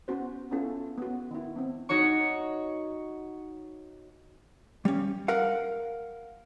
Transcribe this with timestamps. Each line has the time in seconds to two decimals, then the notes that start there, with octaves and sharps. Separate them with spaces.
0.08 B3 C#4 F#4 C5
0.51 B3 C#4 E4 F4 A4
0.98 B3 F#4
1.31 D#3 E4
1.56 B3 C4
1.89 D#4 F#4 C#5 C#6
4.85 G3 C#4
5.28 A#4 F5 F#5